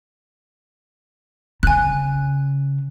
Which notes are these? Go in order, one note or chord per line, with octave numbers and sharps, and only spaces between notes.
C#3 G#5 F#6